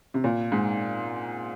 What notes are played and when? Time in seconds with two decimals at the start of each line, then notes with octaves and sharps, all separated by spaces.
0.14 C3
0.24 A#2
0.52 G#2